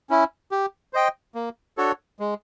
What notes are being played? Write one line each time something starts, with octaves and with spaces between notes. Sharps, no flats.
C#4 E4
G4
C5 D#5 G5
A#3
D4 F#4 A4 C#5
G#3